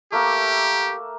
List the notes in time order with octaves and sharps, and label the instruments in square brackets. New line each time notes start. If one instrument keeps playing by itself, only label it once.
[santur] A3 A#3 E5 [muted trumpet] G4